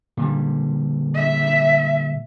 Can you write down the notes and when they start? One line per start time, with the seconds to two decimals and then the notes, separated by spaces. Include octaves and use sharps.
0.17 A#2 D3 G3
1.15 E5